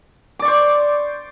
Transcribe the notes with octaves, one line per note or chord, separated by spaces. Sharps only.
C5 D5 C#6 D6